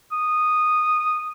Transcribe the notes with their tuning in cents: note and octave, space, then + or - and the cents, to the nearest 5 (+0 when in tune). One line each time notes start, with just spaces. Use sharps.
D#6 -10